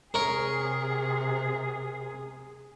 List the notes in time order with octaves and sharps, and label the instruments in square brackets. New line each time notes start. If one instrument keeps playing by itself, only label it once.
[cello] C3 G#4 [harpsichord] A#4 C#5